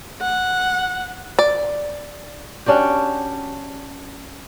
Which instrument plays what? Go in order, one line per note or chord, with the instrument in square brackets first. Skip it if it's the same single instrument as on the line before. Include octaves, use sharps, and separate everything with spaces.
[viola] F#5
[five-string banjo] D5
[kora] C#4 D4 F#4 G4